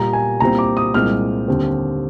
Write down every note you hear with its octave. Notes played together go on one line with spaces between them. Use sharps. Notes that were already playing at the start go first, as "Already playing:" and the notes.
Already playing: A#2 G3 A#3 A#5
G#5
C2 A#2 G3 C4 A#5
D6
D#6
C2 A#2 G#3 C4 F6
D#2 D3 G3 C4